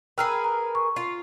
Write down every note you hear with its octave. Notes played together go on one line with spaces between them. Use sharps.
G#4 A#4 B4 G5 E6 F6
A#5
C#6
F4